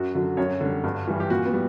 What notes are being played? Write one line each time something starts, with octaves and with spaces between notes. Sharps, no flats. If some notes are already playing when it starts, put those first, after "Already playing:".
Already playing: F#2 F#4
D3 F#3
F#2 C#5
D3 G3
G2
E3 G3
G4
A#2 F#4
B3
G3